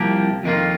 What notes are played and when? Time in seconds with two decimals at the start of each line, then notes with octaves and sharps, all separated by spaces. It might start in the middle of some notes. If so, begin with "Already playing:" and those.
Already playing: C2 C3 F3 A#3 G4
0.43 F2 D#3 A#3 F4